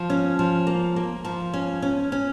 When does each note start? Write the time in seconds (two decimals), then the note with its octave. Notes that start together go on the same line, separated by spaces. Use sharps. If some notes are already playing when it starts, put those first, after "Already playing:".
Already playing: F3
0.10 C#4
0.39 F3
0.67 A#3
0.96 A#3
1.25 F3
1.54 C#4
1.82 C#4
2.12 C#4